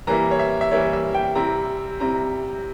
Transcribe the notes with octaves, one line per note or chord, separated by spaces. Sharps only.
E3 G3 A#3 E4 A#5
C#5
E5
E5
E3 G3 A#3 E4 C#5
E5
G5
C3 G3 C4 E4 A#5
C3 G3 C4 E4 A#5